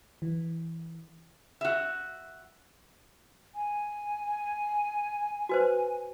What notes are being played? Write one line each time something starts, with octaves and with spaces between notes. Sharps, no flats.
E3
F#4 E5
G#5
F#4 B4 C5